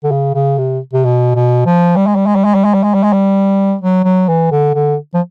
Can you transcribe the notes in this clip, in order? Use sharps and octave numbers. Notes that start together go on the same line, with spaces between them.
D3
C#3
C#3
C3
C3
B2
B2
F3
G3
G#3
G3
G#3
G3
G#3
G3
G#3
G3
G#3
G3
G#3
G3
F#3
F#3
E3
D3
D3
F3